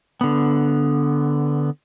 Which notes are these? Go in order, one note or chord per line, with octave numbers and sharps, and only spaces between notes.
D3 B3